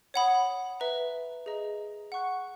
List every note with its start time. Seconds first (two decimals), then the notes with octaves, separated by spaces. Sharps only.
0.14 C#5 F#5 B5 D#6
0.80 B4 E5 A#5
1.46 G#4 D#5 A#5
2.12 F#5 C#6 F#6